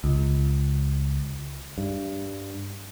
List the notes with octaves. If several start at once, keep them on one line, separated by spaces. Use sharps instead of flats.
C#2
G2